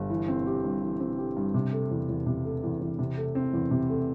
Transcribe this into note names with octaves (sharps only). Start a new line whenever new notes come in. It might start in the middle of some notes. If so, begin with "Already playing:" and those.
Already playing: G1
E3
C4
G4
G2
E3
C4
G4
G2
C3
A3
E2
E2
C3
A3
E2
E2
C3
A3
C4
E2
C3
A3